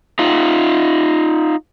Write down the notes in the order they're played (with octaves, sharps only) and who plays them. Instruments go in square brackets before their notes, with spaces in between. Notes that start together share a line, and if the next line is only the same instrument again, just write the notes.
[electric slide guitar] D#4 F4